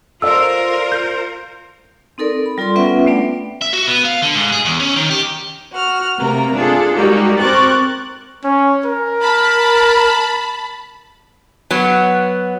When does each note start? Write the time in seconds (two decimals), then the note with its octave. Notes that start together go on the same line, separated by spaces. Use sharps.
0.22 F4 A4 A#4 C5 D5 E6
0.92 G6
2.18 C4 D#4 A4 A#4 D5
2.46 B5
2.58 G3 F4 A4 D5 C6
2.75 B3 C#4 F4 B4 E5 F#5
3.06 A3 B3 D4 D5 G5
3.61 E5
3.73 F#4
3.87 B3
4.04 F5
4.22 D3
4.35 G#2
4.52 G#4
4.65 E2
4.80 C#4
4.96 D#3
5.10 G4
5.73 F#4 F6
6.19 C3 A3 A#3 A#4
6.54 D4 F4 G#4 A4
6.94 G3 G#3 A#3 D#4 F#4 G4
7.39 C4 A#4 C#6 D6 F#6 A6
8.44 C#4
8.86 A#4
9.20 A5 B5
11.71 F#3 B3